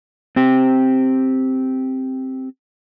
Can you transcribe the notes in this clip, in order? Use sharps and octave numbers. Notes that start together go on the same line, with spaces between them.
C4 G4